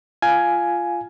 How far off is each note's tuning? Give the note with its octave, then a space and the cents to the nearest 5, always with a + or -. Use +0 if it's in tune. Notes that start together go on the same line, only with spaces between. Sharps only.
F4 -15 F5 +0 G#5 +10